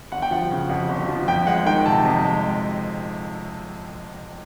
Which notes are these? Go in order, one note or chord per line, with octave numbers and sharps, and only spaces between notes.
G1 F#5
G5
F3 F#5
C#3
F2 F#5
G1
F3
F2 G5
G#3 F#5
D#3 G5
C3 A5
F2
G#3